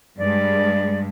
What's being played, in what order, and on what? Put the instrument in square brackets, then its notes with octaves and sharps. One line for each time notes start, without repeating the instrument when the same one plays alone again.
[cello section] G2 G#3 [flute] D5